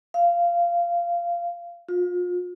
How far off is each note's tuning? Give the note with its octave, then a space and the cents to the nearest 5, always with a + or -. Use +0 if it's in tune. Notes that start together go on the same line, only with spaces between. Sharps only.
F5 -15
F4 +35